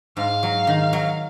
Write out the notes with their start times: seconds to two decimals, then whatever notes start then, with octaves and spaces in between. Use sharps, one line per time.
0.17 G#2 F5
0.43 F#3
0.67 D#3
0.93 F#3